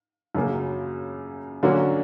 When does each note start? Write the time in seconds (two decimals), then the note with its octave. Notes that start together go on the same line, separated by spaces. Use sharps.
0.35 F#2 C#3 F#3 A#3
1.63 D3 F#3 A#3 C#4 F#4